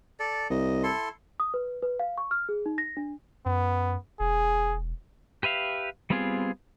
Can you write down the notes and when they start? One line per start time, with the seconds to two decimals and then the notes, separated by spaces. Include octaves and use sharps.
0.19 A4 D5
0.50 C2 D#5
0.83 E4 A4 C6
1.40 D#6
1.54 B4
1.82 B4
1.99 F5
2.18 C#6
2.31 F6
2.49 G#4
2.66 D#4
2.78 A#6
2.97 D4
3.46 F#2 B3
4.20 E1 G#4
5.43 G4 B4 E5 F5
6.10 G3 B3 C4 F4 G#4